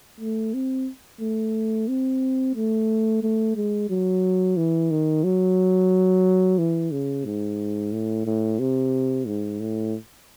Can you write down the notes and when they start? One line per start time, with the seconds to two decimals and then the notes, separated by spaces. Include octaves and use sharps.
0.20 A3
0.54 C4
1.21 A3
1.88 C4
2.55 A3
3.23 A3
3.56 G#3
3.90 F#3
4.57 E3
4.91 D#3
5.24 F#3
6.58 E3
6.92 C#3
7.25 G#2
7.92 A2
8.26 A2
8.59 C3
9.27 G#2
9.60 A2